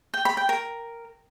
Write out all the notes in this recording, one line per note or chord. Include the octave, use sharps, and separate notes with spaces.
G5
B5
G5
A#4